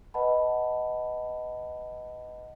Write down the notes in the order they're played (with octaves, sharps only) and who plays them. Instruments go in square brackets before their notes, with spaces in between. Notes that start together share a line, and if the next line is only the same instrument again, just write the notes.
[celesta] B4 D#5 F#5 A5 B5